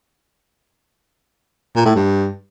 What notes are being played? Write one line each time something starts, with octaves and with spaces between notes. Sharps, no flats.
A#2
A2
G2